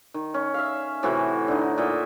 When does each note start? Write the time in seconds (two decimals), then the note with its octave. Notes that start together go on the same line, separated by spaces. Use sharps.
0.14 D#3
0.34 C#4
0.54 E5 F5
1.03 A2 C3 E3 F#4
1.48 D3 D#4
1.78 A#2 D#5 E5